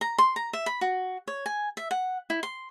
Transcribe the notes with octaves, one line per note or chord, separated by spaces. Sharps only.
A#5
C6
A#5
E5
B5
F#4
C#5
G#5
E5
F#5
E4
C6